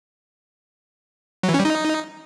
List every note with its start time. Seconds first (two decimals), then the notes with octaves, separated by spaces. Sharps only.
1.43 F#3
1.49 E3
1.54 C#4
1.60 G3
1.65 D#4